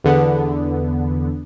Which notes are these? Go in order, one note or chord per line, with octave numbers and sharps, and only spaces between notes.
E2 D3 B3